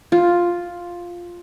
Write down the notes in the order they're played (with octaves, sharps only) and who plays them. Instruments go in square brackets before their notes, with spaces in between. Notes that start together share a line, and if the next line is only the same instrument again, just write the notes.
[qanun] F4